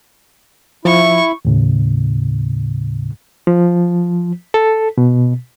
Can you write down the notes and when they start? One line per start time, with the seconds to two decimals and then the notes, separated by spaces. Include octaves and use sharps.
0.85 F3 E4 C#6
1.45 D#2 A2 C#3
3.47 F3
4.54 A4
4.98 B2